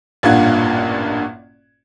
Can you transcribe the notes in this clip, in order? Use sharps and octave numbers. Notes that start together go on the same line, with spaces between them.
A1 G2 A#2 F4 F#5 G#6